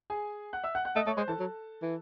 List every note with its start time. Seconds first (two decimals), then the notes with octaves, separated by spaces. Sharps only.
0.10 G#4 G#5
0.53 F#5 F#6
0.63 E5 E6
0.75 F#5 F#6
0.85 F#5 F#6
0.96 A3 D#5 D#6
1.07 A3 C#5 C#6
1.17 G#3 C5 C6
1.28 E3 A4 A5
1.39 F#3
1.82 E3